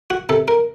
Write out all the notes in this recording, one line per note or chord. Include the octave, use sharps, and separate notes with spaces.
F#4
C3 A4
A#4